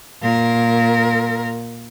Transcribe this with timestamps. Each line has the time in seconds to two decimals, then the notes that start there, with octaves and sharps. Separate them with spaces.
0.22 A#2 A#4